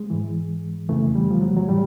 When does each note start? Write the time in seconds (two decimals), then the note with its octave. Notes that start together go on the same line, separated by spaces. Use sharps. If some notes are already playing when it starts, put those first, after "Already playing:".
Already playing: G#3
0.10 G#2 E3
0.89 F2 C#3 E3 A3
1.15 G3
1.31 F3
1.42 F#3
1.56 F#3
1.69 A2 E3 G3